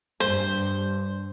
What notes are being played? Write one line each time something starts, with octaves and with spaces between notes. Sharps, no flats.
G2 C5